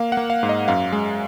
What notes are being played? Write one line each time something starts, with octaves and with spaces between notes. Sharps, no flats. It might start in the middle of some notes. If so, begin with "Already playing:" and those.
Already playing: A#3 F5
F#5
A#3
F5
G#2
D#5
F#2 F5
G#3